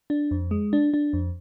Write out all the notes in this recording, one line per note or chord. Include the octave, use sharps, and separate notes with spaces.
D4
F2
G#3
D4
D4
F2